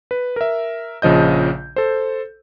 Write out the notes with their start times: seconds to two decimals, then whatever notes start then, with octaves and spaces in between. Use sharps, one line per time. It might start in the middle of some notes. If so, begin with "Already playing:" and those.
0.11 B4
0.36 A#4 E5
1.02 A#1 C#3 F3 D#5 G6
1.76 A4 C5